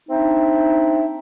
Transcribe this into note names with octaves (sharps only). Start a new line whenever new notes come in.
C4 D4 D#4 E5